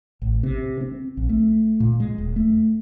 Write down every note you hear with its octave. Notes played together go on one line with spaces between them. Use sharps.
A1
C3
C4
A#1
A3
A#2
G#3
D#1
A3